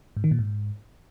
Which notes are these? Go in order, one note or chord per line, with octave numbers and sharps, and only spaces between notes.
G#2
D#3
A#2
G#2